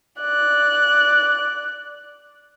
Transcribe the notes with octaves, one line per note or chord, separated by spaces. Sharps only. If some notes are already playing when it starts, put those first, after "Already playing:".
D5 F#6